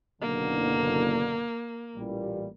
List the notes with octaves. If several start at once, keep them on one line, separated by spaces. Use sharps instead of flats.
F#1 B2 D3 A#3
A1 A#2 G3